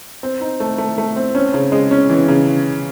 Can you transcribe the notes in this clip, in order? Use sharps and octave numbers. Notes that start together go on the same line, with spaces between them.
C4
D#4
A3
A3
A3
C4
C#4
C#3
G#3
C#4
E3
C#3